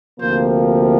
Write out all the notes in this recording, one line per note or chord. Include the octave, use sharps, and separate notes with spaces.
D2 C3 F3 A#3 C5